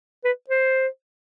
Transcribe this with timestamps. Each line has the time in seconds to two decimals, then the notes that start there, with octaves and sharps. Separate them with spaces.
0.24 B4
0.50 C5